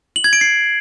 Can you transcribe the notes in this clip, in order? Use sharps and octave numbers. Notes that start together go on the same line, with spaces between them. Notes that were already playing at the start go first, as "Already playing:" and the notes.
F#7
G#6
D7
C7